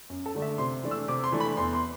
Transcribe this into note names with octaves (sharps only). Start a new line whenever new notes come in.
F#2
A4
D3 A3 D4
E5
C3 C6
E3 A3 D4
E6
C3 D6
C6
E3 A3 D4
B5
E2 C6
C6